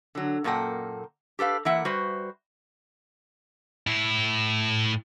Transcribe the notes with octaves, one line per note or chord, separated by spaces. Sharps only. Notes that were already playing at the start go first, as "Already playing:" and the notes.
D3 F#3
F#2 A#2 A#3 A4 F#5 G5
G4 A4 B4 F5
E3 A#3 A4 E5 F#5
G3 F#4 B4 C5
A2 E4